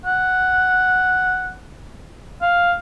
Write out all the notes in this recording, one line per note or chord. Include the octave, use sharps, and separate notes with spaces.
F#5
F5